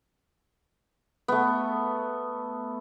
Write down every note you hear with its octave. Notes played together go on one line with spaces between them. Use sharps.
A3 B3